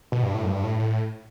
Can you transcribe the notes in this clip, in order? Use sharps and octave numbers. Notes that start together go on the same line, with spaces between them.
B2
G2
A2
F#2
G2
A2
A2